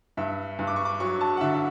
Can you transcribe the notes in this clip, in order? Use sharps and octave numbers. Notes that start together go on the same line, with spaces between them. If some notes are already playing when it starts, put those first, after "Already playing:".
G2 E5
G2
D6
C#6
D6
F#3 C#6
A5
F#5
D3 E5